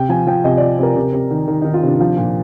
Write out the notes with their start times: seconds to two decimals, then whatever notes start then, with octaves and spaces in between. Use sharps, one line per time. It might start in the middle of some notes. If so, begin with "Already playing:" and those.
Already playing: C3 G5
0.09 F3 G#5
0.27 F3 G5
0.44 C3 D#5
0.57 F3 D5
0.79 C3 A#4
0.96 C3
1.13 C3
1.31 D#3
1.48 D#3
1.62 D#3 D#4
1.74 F4
1.82 C3 D4
2.00 F3
2.17 A#2